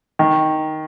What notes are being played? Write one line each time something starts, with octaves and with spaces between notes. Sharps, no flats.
D#3